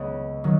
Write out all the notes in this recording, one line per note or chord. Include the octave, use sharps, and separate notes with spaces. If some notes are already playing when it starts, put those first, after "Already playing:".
Already playing: C#2 C#3 B3
D#3 F#3